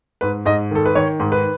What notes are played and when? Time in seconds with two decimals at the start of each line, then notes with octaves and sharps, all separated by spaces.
0.21 G#2 B4
0.45 G#2 D#5
0.71 D#3 A4
0.86 B4
0.95 D#3 C#5
1.20 G#2
1.32 B4